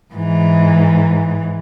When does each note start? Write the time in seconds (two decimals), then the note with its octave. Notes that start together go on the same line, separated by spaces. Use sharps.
0.14 G#2 E3